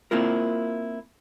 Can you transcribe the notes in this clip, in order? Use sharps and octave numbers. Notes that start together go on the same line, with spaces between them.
A#3 C4 E4 F4 A#4